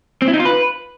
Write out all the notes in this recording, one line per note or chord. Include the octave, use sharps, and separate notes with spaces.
C4
E4
D#4
F4
B4